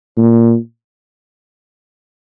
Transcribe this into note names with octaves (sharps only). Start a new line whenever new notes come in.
A#2